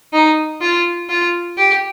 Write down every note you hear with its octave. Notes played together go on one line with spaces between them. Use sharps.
D#4
F4
F4
G4